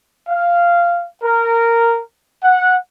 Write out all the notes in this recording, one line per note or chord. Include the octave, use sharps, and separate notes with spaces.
F5
A#4
F#5